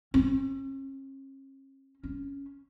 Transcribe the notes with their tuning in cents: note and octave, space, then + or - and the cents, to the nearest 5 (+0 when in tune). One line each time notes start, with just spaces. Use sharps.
C#4 -45
C#4 +5